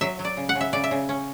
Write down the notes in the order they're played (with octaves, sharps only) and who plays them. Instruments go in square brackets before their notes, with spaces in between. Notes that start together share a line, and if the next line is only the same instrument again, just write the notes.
[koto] F#3 E5
F#3
D5
C#3
F#5
C#3
E5
C#3 D5
E5
C#3
C#4